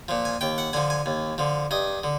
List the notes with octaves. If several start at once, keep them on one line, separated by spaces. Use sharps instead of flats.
A#2 F3
G#5
D#2 G5
F#5
D3 F3 G#5
G#5
D#2
D3 F3
G2 D#5
D3